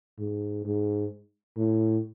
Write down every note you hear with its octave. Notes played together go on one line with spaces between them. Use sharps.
G#2
G#2
A2